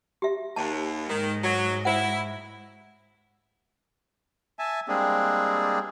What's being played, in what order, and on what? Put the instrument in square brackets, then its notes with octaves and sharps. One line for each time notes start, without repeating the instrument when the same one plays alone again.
[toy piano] G4 E5
[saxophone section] D#2 [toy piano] A5
[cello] G#2 G#3 [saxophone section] D#3
[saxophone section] F#3
[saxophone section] E4 [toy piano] C5 F#5
[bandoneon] E5 G#5 A5
G3 G#3 A#3 C4 D4 G#4